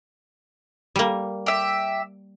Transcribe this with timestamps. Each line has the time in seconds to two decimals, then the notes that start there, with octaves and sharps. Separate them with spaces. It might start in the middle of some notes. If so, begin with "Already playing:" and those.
0.96 G3 A#3
1.46 G4 E5